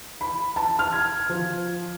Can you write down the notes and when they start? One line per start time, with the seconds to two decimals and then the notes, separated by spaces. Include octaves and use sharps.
0.21 B5
0.56 A5
0.79 F6
0.93 G#6
1.30 F3